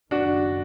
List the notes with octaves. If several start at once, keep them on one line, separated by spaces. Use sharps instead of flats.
F#1 F#2 D#3 D4 F#4